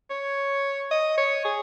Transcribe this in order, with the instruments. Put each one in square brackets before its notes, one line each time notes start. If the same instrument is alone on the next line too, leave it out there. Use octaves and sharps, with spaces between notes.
[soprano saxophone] C#5
D#5
C#5
G#4